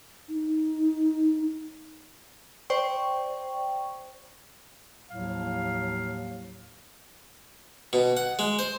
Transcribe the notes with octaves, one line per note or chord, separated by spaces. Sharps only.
D#4
C5 D5 G5 C#6
D#2 A2 F3 F#3 F5
B2
F#5
G#3
C5